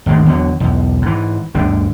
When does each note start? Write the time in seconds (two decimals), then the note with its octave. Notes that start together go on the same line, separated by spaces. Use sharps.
0.06 G#1 D2 A#2 G#3
0.26 E2 D3 D#3 F#3
0.60 B1 E2
1.02 G#2 E3
1.55 D2 G2 A#2 D3